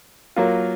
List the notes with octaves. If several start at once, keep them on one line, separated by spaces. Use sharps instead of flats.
F#3 A#3 F4